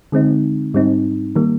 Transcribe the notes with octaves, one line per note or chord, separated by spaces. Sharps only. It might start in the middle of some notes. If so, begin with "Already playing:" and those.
D3 G#3 C4 D#4
G#2 G3 C4 D#4
D#3 G3 A#3